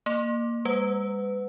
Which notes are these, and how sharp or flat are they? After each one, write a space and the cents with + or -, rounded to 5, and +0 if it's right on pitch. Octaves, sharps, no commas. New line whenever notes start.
A#3 +0 D6 +0
G3 +45 B4 +30 F#5 -10